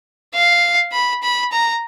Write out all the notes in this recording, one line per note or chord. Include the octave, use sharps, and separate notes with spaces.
F5
B5
B5
A#5